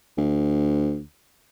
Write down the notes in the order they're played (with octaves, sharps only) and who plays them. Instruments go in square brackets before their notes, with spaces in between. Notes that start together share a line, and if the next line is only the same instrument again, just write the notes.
[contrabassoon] D2